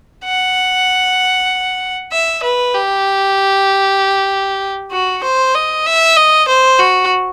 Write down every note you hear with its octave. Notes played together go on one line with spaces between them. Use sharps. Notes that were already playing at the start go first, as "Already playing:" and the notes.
F#5
E5
B4
G4
F#4
C5
D#5
E5
D#5
C5
F#4